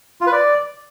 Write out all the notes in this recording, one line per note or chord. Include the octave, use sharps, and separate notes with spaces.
F4
B4
D5